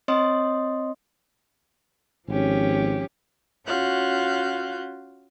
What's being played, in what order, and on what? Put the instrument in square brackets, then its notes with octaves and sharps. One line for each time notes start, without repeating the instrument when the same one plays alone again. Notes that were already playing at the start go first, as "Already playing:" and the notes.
[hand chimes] C4 C#5 D#5 C6 D#6
[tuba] G#1 [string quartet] F3 C#4 G4
[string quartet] C#4 F4 F#4 F5 F#6 G6